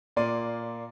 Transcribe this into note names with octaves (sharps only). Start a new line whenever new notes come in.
A#2 A#3 D5 C6 D#7